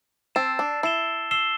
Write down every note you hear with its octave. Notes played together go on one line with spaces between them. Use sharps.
C4 A5 E6 A6 C7 E7
D4
E4 E6 C7 E7 G7
E6 C7 E7 G7